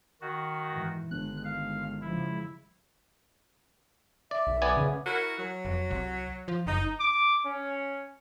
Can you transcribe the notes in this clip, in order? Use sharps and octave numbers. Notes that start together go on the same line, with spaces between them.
D#3 F#4
G#2 E3
G1 D#3 G#3 F#6
F5
C#3 F3 G#3 E4
D5 E5
B1
B3 D5 G#5
C#3
E4 F#4 A#4
F#3
F1
C2
F3
F#1 D#4
D6
C#4